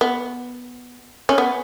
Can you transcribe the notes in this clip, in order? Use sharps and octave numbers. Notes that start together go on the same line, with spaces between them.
B3
C#4
B3